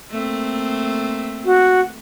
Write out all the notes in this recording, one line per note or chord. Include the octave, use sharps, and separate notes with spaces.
A3 A#3 C4
F#4